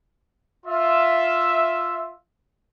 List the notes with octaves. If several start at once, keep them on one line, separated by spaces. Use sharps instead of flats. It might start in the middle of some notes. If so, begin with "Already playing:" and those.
F4 E5